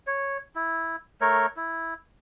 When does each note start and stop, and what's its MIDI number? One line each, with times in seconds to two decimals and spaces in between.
0.07 0.38 73
0.56 0.96 64
1.21 1.46 57
1.21 1.46 70
1.21 1.46 73
1.57 1.94 64